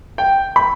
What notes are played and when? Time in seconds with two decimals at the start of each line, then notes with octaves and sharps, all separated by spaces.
0.18 G5
0.56 B5